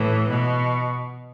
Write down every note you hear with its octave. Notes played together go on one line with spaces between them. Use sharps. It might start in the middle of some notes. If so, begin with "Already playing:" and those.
Already playing: A2 E3
B2